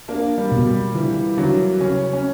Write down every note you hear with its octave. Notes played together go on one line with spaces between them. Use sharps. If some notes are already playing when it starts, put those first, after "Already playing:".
A#3 D4
G3
B2
G3
D3 E3
D3 F#3
C#3 C#4
C#4